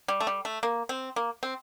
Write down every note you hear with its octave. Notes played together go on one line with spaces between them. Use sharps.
G3
A3
G3
A3
A#3
C4
A#3
C4